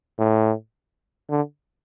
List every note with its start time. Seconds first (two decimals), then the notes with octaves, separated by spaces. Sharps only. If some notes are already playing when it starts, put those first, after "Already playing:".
0.19 A2
1.30 D3